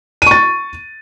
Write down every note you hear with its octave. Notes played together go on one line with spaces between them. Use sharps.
C#6 A6 D#7